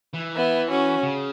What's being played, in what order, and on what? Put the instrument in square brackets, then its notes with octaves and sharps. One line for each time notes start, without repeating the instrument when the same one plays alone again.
[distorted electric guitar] E3
[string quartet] B3 E4
C#4 F#4
[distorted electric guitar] C#3